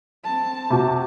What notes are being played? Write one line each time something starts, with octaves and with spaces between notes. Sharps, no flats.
C4 A5
C3 F#4